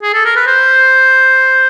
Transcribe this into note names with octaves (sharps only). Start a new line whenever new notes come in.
G#4
A4
A#4
B4
C5